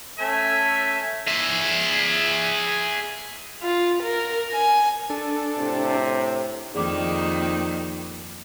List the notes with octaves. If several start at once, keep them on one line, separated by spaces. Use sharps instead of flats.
A3 C#4 A4 E5 G#5
G#4 E5
F4
A#4
G#5
D4 A4
A2 C3
F2 D#3 A#3 D#4 G#4 D5 D6